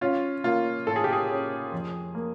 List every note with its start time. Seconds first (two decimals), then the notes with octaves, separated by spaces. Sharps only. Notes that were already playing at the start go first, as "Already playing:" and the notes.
0.01 C#4 F4
0.44 A#3 F4
0.86 A2 A4
0.96 G#4
1.04 G4
1.13 G#4
1.29 C#4
1.72 F2
2.15 A#3